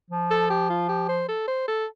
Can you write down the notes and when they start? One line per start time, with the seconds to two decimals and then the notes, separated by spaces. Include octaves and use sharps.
0.10 F3
0.31 A4
0.50 G4
0.70 F4
0.89 G4
1.09 C5
1.29 A4
1.48 C5
1.68 A4